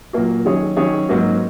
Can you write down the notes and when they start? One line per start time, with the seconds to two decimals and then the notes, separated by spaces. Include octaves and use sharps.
0.13 A#2 F#3 A#3 F#4
0.45 D#3 F#3 C#4 G#4 C#5
0.77 D#3 F#3 C#4 G#4 C#5
1.09 G#2 F#3 A#3 C#4 F#4